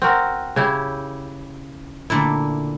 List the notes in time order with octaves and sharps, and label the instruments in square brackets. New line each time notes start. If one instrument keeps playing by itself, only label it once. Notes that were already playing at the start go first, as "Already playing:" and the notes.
[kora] C4 F#4 A#4
C#3 E4 G4
[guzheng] A#2 D3 A3 [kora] E4